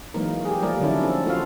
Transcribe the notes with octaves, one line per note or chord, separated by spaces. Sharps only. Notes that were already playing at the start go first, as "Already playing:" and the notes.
E3 F#3 G#3 A#3 D#4 A#4
G4 G#4
F3 G3 A3 A#3 A#4 D5
D3 D#3 F#3 C#4 E4 A4
C4 A4
A3 F4 F#4 A4 F5